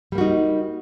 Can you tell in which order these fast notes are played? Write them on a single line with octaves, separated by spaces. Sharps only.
G3 A#3 F#4 D#4